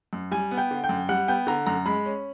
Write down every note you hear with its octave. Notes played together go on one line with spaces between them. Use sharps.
F#2
G3 G#5
B3
G5
D3
G5
F#2
G3 F#5
B3 G5
D3 A#5
F#2 A#5
G#3 B5
C#4